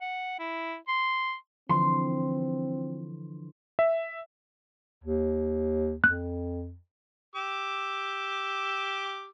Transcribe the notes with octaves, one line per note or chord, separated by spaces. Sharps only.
F#5
E4
C6
D3 E3 F3 C4 C6
E5
D#2
F2 F#6
G4 D6 E6